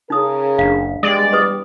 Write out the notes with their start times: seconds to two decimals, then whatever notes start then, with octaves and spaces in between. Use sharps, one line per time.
0.10 C#3 D#4 G#4 A#4 D#6
0.58 F#1 D4 F5
1.03 E2 G3 G#3 D5
1.33 G4 B4 D#6